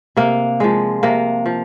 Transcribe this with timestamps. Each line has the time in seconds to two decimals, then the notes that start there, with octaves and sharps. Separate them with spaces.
0.16 C3 A#3
0.60 F3 G#3
1.03 C3 A#3
1.46 F3